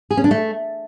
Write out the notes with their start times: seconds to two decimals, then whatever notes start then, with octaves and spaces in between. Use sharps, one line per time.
0.11 G#4
0.17 C#4
0.24 D4
0.31 A3